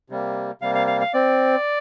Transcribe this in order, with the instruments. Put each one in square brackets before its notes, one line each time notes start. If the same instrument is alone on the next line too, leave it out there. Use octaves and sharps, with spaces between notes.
[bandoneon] C3 G3 A#3
C3 G3 A#3 F5
F5
F5
F5
C4 D5